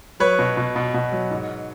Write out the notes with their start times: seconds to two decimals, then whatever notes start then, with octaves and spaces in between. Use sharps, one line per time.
0.20 F#3 B4 C#5
0.39 B2
0.57 B2
0.76 B2
0.94 B2
1.12 F#3
1.31 G#2